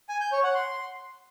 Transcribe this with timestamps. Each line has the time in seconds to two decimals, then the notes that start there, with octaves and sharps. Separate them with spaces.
0.09 G#5
0.21 G6
0.32 C#5
0.43 F#5
0.55 C6